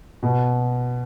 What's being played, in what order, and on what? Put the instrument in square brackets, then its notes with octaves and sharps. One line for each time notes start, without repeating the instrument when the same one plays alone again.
[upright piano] B2